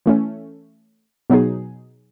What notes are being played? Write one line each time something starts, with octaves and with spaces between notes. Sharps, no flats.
E3 A3 C#4
B2 F#3 B3 D#4 G#4